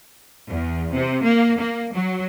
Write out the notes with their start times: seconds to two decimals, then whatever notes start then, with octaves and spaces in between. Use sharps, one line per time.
0.50 E2
0.94 C3
1.24 A#3
1.58 A#3
1.94 F#3